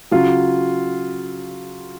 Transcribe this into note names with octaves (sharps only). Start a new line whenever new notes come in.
C#3 F#3 F4